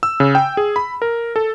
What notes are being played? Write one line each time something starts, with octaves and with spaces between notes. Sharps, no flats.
E6
C#3
G5
G#4
B5
A#4
A4